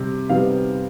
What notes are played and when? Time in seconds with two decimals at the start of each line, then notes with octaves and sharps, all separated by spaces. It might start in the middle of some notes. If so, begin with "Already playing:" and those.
Already playing: C3 G3
0.30 C3 G3 B3 F5